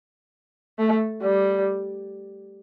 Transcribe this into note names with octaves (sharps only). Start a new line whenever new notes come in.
A3
G3